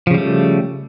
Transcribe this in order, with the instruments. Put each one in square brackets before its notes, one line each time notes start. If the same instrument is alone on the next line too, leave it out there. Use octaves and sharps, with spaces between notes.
[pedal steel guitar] F3
C#3
G3
A3